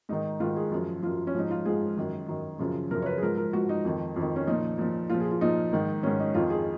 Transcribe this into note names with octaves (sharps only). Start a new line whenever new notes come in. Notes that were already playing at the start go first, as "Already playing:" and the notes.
G#2 D#3 D#4
G#2 D#3 F4
G#4
F#2 F3
F#2 F3 F4
C#4
G#2 F3 D#4
F4
G#2 F3 G#4
F#2 D#3
F#2 D#3
F#2 C#3 F3
F#2 C#3 F3 A#4
C#5
B4
G#4
G#2 F3 A#4
A#4
G#2 F3 F#4
D#4
F2 D#3
F2 D#3
C#4
A#2 F3 D#4
A#2 F3
A#2 F3 F4
G#4
F4
A#2 F3 D#4
G#2 D#3
G#2 D#3 C#4
D#4
F2 D#3 F4
G#4